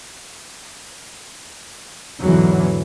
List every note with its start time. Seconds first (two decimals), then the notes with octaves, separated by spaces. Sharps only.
2.23 E2 G#2 D3 E3 F#3